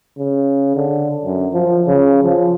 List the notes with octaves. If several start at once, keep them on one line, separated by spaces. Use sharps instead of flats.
C#3
D3
F#2
F3
C#3
F3